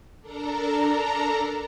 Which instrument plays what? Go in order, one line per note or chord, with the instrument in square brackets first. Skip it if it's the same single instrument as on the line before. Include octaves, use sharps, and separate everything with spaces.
[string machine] D4 A4 A#4 A#5